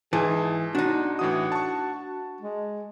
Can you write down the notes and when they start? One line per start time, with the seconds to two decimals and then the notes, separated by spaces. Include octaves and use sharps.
0.13 G#2 E3 G#4 A5
0.75 D4 D#4 F#4
1.19 A2 E3 F#4 D#6
1.52 A5 C#6
2.40 G#3